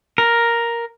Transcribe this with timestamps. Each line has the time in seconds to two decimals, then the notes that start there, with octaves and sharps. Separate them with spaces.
0.18 A#4